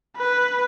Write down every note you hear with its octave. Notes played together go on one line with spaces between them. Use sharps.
B4